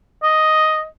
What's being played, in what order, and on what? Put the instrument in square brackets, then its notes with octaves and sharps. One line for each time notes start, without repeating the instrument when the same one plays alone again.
[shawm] D#5